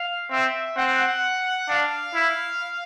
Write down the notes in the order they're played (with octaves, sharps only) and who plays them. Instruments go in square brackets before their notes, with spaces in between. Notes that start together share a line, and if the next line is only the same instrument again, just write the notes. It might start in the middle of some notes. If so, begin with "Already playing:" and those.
Already playing: [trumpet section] F5
[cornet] C4 [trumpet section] E5
[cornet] C4 [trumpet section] F#5
[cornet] D4 [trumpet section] F5
[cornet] E4